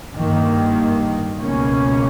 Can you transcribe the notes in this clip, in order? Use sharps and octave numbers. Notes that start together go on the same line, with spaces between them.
G2 D#3 A#3
C#2 B2 A#3 C#4